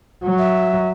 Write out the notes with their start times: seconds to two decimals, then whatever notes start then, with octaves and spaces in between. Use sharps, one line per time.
0.24 F#3
0.38 E5